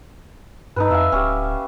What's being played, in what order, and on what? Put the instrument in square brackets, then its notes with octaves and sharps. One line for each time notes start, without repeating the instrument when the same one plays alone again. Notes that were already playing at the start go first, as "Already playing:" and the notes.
[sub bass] G2 [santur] D#4 A4 B4
[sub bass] F2 [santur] E5 F5 G#5
[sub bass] D1 [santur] C#4 G4